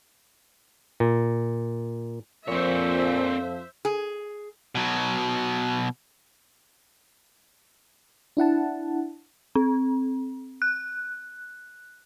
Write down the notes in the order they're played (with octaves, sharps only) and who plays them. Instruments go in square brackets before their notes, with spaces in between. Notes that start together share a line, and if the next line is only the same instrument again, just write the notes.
[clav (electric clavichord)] A#2
[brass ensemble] F2 F3 [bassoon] A#2 [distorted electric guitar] C4 C#5 [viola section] C5 E5
[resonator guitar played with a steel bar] G#4
[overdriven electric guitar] B2 F#3
[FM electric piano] D4 E4 F#5 A5
[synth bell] C4
F#6